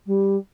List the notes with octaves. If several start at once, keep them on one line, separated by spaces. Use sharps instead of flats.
G3